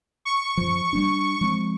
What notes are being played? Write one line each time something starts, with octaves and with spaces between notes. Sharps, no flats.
C#6
F#2 F3
G3 A#3 D4
F3 G#3 C4